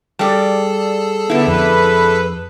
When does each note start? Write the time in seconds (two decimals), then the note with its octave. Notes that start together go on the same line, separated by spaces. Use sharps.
0.19 G3 G#4 A4 D5 A5
1.30 D3 B3 E4
1.47 F2 B4